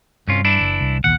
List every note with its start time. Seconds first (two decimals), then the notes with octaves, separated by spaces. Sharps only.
0.28 C2 G2 C#4 F4
0.45 E3 D4 E4
0.61 F#1
0.81 C2
1.04 A#1 D#2 F#5